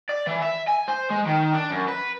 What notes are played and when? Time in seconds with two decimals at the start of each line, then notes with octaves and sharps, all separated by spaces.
0.09 D5
0.27 E3
0.43 E5
0.68 G#5
0.88 C5
1.11 G#3
1.27 D#3
1.54 D4
1.71 F#2
1.88 B4